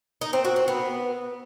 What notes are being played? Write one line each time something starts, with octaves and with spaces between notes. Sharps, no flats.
D#4
C4
F#4
C4
B3